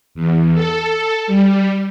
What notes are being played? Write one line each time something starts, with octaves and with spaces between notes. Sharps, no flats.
E2
A4
G3